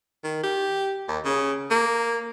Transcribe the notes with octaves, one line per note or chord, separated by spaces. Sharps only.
D#3
G4
D#2
C#3
A#3